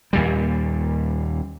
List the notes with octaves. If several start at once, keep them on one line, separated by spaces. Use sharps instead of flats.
D#2 A#2 G3